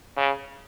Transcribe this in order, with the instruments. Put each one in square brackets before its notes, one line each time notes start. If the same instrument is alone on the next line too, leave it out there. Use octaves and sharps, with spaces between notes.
[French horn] C#3